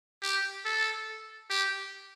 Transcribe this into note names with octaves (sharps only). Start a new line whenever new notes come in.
G4
A4
G4